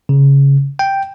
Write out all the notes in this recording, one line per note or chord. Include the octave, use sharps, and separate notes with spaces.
C#3
G5